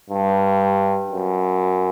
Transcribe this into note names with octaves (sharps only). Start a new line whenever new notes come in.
G2
F#2